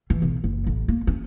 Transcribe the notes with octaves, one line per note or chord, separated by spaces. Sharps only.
E3
B1
F#1
A1
A#3
C#4